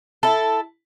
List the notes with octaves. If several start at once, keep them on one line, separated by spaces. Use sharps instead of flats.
E4 A4